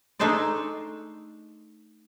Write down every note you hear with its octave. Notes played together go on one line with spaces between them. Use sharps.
A3 D4 D#4 G#4 C5 D5